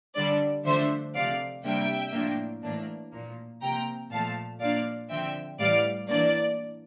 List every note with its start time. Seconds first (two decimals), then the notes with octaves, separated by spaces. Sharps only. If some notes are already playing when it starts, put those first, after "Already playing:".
0.15 D3 G3 D4 D5
0.65 D3 F3 A3 D4 C5 E5
1.14 C3 F3 A3 D5 F5
1.64 C3 G3 A#3 D4 E5 G5
2.13 A2 F3 A#3 D4
2.63 A2 E3 A#3 D4
3.12 A#2 F3 A#3
3.62 C3 F3 A#3 G5 A#5
4.11 A#2 F3 A3 F5 A5
4.60 A#2 F3 A#3 D4 D5 F5
5.10 D3 F3 C4 E5 G5
5.59 A2 E3 G3 D5 F5
6.08 E3 A#3 D4 D5